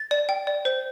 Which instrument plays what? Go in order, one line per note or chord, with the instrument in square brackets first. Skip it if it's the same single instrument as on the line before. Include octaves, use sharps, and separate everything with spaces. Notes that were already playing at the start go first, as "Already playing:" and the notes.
Already playing: [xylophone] A6
D5
G5
D5
C5